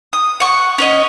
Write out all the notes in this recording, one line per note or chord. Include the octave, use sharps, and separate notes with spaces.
D#6
F#5 C#6
C#4 C#5 D#5